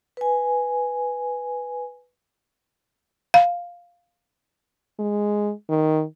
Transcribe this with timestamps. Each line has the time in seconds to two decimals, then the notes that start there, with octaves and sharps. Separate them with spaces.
0.17 B4 G#5
3.34 F5
4.99 G#3
5.69 D#3